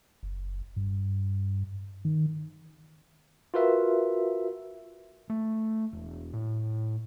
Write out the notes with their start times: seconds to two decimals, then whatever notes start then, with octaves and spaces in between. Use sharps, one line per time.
0.23 F#1
0.76 G2
2.05 D#3
3.54 F4 F#4 A#4 B4 E5
5.30 A3
5.93 E1
6.33 A2